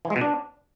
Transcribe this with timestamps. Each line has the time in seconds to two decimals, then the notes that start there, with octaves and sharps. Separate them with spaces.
0.05 E3
0.10 G#3
0.16 B2
0.21 D4